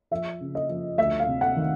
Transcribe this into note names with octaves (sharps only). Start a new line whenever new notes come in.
F3 E5
C#3
D#5
F3
D2 E5
F5
C3
F#5
D#3